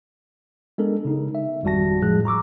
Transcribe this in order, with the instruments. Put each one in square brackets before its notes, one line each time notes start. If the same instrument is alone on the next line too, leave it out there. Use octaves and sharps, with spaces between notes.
[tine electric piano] G#3 B3 D4 A4 A#4
C#3 D#4
E5
G#1 F2 G3 F#4 A5 A#6
A2 F3 G#3 G#4 F#6
A#5 C#6 D6 E6